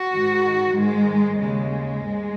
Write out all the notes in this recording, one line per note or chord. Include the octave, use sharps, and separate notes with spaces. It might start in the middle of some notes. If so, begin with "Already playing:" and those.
Already playing: F#4
G#2 D#3
G#2 D#3 G#3
D#2 C#3 G#3
G#2